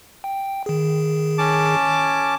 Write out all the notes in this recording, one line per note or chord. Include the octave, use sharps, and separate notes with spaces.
G5
D#3 G#4
C#4 A5 D6